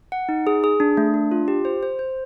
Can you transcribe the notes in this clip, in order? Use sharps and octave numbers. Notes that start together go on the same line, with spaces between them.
F#5
D#4
G#4
G#4
D4
A3
D4
F4
G4
C5
C5
C5